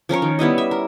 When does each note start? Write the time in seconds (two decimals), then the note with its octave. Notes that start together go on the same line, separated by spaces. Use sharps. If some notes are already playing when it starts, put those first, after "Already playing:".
0.09 F3 C#4 A#4 C#5
0.22 D#3
0.39 G3 B3 E4 D#5
0.58 E5
0.71 A#4